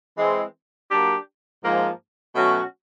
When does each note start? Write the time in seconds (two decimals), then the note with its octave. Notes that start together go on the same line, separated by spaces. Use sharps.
0.17 E3 G#3 C4
0.90 F#3 A#3 D4 G4
1.62 G#2 F3 A#3
2.35 B2 F#3 A3 C#4 F#4